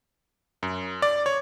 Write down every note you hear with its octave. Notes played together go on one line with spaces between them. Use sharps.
F#2
D5
C#5